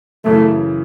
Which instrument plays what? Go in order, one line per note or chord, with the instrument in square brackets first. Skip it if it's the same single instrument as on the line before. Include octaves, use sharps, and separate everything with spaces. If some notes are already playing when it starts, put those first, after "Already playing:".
[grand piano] F#2 C#3 E3 [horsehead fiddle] A3